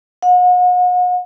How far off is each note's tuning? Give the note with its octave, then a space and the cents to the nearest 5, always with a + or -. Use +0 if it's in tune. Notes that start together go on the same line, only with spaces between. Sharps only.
F#5 -40